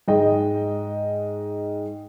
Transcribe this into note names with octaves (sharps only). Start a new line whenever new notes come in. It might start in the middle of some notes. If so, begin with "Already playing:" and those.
G#2 G#3 D#5 G5